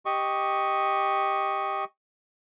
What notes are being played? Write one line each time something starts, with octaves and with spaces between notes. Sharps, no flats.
G4 D#5 C#6